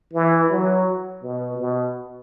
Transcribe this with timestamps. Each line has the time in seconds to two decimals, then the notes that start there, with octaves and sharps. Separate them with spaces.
0.14 E3
0.50 F#3
1.23 B2
1.58 B2